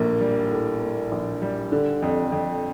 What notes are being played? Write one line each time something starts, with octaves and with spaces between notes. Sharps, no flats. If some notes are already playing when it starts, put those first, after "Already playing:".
Already playing: A#1 A2 A#3
G3
A2
A#3
A#1
G3
D3
F2
F2